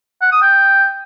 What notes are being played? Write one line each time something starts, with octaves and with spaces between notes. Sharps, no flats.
F#5
D#6
G5